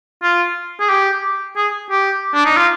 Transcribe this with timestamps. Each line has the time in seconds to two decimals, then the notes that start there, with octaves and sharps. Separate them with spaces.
0.23 F4
0.80 G#4
0.89 G4
1.57 G#4
1.91 G4
2.34 D4
2.45 D#4
2.57 F4